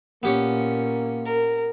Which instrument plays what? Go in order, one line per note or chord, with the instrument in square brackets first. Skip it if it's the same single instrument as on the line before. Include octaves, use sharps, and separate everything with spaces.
[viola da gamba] A#2 C#4 [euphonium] A#3 [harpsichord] B3 G4 C#5
[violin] A#4